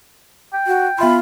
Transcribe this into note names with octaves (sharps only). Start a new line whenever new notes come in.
G5
F#4
B3 F4 E5 B5 C6